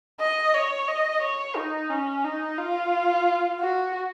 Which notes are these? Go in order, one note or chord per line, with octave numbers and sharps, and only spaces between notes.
D#5
C#5
D#5
C#5
D#4
C#4
D#4
F4
F#4